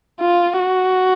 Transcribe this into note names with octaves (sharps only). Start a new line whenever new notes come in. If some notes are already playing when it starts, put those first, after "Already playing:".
F4
F#4